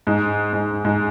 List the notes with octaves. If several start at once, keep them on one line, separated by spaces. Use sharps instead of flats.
G#2
G#2
G#2